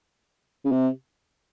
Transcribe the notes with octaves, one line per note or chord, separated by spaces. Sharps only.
C#3
C3